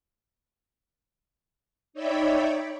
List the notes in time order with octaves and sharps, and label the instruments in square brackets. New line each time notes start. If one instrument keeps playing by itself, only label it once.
[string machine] D#4 C#5 D5 E5 G5 B5